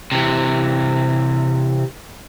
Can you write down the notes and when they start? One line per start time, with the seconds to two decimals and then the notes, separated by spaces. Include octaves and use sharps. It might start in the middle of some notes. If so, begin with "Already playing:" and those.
0.12 C3 E3